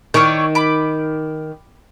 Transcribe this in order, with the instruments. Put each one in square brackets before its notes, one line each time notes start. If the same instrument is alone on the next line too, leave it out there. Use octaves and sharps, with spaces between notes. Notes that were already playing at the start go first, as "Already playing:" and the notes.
[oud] D#3 [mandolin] D4 E4 C#5
[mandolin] B5 D6